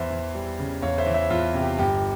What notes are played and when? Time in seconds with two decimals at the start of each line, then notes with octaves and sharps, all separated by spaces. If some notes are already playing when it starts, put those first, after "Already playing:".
Already playing: E2 C5 E5
0.10 E3
0.35 G3
0.59 C#3
0.82 E2 C#5 F5
0.98 C5 E5
1.06 E3
1.14 C5 E5
1.30 E2 F4
1.54 C3
1.62 G4
1.78 G1 G4